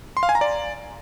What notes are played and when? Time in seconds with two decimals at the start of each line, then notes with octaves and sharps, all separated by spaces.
0.17 C6
0.23 F5
0.29 G#5
0.35 A#5
0.41 D5